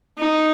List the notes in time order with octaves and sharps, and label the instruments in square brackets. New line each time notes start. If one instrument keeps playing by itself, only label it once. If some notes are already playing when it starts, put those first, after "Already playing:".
[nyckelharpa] D#4